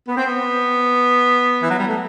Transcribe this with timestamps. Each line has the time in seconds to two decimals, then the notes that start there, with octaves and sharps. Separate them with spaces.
0.08 B3
0.17 C4
0.27 B3
1.63 E3
1.71 F#3
1.80 G3
1.88 A3